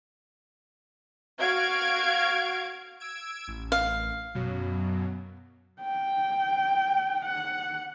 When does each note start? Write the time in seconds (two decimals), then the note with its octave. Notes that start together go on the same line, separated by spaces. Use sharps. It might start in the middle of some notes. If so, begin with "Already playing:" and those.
1.39 F#4 F5 G#6 D7
3.00 E6 G#6 D7
3.48 A1
3.72 F5
4.35 F#2 B2 F#3
5.81 G5
7.25 F#5